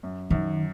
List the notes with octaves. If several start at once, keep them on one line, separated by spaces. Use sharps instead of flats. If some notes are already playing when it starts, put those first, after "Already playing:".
F#2
F#2 D#3